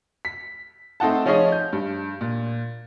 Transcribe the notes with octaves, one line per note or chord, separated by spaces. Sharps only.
B6
A3 C4 D#4 F#5 A5
F3 C#4 D#4 G#4 C#5 D#5
G6
G2
A#2